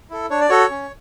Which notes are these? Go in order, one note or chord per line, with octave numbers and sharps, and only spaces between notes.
E4 A4
D4 C#5
D5
F#4 A4 C#5
C#4